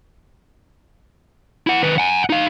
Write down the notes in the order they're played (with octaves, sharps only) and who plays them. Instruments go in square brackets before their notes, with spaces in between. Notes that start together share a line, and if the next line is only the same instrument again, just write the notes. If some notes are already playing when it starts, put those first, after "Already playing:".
[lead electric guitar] E4 F#5
D#3 B4
F#5 G#5
D#4 F5